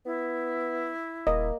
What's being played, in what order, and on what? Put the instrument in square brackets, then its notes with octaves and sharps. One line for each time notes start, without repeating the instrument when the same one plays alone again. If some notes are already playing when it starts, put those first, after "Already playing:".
[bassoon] B3 [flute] E4
[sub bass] D#1 [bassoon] A#3 [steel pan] D#5